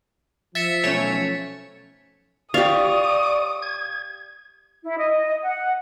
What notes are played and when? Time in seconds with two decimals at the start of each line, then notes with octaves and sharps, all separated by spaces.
0.55 F3 E5 A6 B6 C#7
0.84 B1 A3 C#4 C#5 E7
2.54 G4 D5 F5 C#6 D#6
3.62 G#6
4.84 E4
4.98 D#5
5.42 F#5